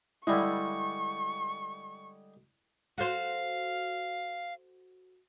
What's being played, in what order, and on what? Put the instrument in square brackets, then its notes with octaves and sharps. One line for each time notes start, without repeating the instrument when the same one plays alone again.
[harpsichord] D3 G3 G#3 [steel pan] E4 [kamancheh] C#6
[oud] F#4 A4 C5 [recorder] F5